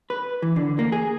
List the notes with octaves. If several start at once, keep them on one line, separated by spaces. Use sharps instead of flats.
B4
E3
D3
A#3
G#4